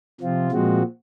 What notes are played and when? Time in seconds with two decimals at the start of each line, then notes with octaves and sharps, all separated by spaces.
0.20 C3 F3 C4 F4
0.52 A#2 F3 G#3 C4 F#4